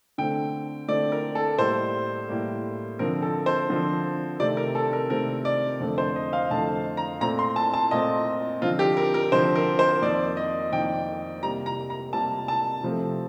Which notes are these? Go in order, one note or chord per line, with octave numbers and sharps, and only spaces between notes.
D3 A3 C4 G5
D3 A3 C4 D5
A#4
A4
A2 G3 A#3 C5
A2 G3 A#3
D3 F3 C4 A#4
A4
C5
D3 F3 C4
C3 D#3 A3 C4 D5
A#4
A4
A#4
C3 D#3 A3 C4 A#4
D5
F2 D3 A3
C5
D#5
F5
F2 D3 A3 A5
A#5
A#2 A3 C4 A#5
C6
A5
A5
A#2 A3 C4 D#5
D3 F3 C4 F4
G4
A#4
A#4
D3 F3 C4 C5
A#4
C5
F2 D#3 A#3 D5
D#5
F2 D#3 A#3 G5
C3 G3 A#3 A#5
A#5
A#5
C3 G3 A#3 A5
A5
C3 F3 A3 C4